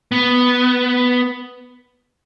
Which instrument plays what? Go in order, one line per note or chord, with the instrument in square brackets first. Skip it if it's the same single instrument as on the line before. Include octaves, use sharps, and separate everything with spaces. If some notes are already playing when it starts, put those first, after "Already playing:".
[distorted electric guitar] B3